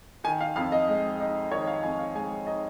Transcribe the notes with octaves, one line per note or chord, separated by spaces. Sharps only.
D#3 G#5
F5
F2 F5
D#5
G#3
D#4
D#3 C#5
F5
F2 G#5
F5
G#3 G#5
D#4 D#5